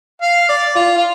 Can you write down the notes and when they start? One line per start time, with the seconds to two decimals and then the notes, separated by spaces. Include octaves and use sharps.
0.22 F5
0.49 D5
0.76 F4
0.97 F4